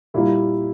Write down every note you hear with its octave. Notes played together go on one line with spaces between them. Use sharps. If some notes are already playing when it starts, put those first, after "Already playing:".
A#2 G3 A#3 E4